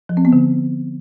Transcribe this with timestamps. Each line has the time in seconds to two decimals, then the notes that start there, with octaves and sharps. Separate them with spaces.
0.09 F3
0.17 C4
0.25 B3
0.33 D3